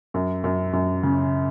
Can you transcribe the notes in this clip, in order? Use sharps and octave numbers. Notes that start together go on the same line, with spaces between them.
F#2
F#2
F#2
C#3